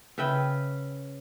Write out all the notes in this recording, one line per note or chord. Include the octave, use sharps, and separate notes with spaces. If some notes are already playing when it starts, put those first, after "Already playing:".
C#3 B4 E5 G5